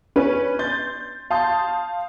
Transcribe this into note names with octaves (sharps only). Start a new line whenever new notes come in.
C#4 B4
C6 G6 A6
F5 A5 C6 D#6 G6